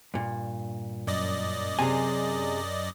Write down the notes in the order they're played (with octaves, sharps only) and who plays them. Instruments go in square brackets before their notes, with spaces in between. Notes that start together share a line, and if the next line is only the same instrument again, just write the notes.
[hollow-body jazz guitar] G2 A#2
[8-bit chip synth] F#2 D5 D#5
[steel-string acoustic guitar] C3 G#4 [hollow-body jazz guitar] G#5